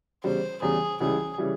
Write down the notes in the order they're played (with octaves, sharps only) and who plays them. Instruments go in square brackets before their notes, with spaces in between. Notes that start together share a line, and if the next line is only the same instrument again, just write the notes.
[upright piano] E2 C#3 G3 [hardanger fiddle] C5
[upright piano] E2 C#3 G3 [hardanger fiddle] G#4
[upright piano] C#2 C#3 E3 G3 [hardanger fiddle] G#4
[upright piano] C#3 E3 G3